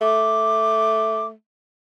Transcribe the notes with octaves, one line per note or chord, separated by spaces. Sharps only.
A3 D6